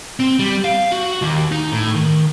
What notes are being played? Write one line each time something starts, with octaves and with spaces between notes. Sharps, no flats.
C4
G3
F5
F#4
D#2
D#4
A2
D#3